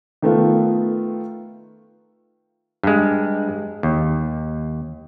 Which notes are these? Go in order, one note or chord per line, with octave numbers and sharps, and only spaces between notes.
D#3 A3 B3 F4
G2 G#3
D#2